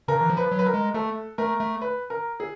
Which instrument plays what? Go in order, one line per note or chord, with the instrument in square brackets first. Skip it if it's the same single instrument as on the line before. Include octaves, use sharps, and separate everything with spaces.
[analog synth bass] C#3 [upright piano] A#4
[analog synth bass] E3
F3
[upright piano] B4
[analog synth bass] F#3
[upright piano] B4
A#4
[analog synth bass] G#3
[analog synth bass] A3 [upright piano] A4
[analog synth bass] A3 [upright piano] A#4
[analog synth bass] A3
[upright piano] B4
A#4
G#4